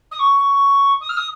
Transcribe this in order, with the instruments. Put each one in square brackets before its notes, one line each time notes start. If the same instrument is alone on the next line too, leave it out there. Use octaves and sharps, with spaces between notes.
[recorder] D#6
C#6
D#6
F6
D#6